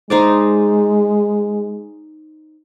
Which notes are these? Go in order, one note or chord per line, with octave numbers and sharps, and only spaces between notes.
G#3 D#4 C5 D5